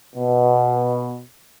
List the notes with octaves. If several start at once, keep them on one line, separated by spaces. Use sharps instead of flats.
B2